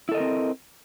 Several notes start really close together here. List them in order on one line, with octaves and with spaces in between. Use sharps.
E4 A4 D#5 A#4 C4